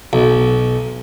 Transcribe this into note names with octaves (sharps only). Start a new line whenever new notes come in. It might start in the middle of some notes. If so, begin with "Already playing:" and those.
B1